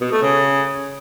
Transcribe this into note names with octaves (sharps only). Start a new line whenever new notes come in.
B2
A3
C#3